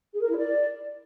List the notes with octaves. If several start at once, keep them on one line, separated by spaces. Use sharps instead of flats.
G#4
A#4
E4
D5